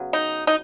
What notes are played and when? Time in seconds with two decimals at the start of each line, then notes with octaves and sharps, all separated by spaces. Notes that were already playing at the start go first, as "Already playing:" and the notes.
Already playing: C#3 F#3 B3
0.13 D#4
0.47 D#4